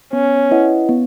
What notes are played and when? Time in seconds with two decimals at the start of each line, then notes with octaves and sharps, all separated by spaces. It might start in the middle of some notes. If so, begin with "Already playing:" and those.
0.13 B3 C#4
0.51 E4 B4 D#5 F#5
0.89 B3